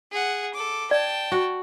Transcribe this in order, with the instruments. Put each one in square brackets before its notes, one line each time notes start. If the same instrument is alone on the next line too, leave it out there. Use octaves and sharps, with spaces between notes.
[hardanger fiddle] G#4 F#5
A4 D6
[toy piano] D5 [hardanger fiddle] G5 A5
[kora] F#4